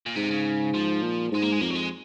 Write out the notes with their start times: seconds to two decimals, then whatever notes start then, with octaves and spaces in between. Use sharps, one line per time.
0.06 A#2
0.16 G#2 C3
0.31 C#3
0.74 F3
1.03 A#2
1.31 G#2 G#3
1.42 A#3
1.52 G#3
1.61 F2 A#3
1.70 F#3
1.75 G#3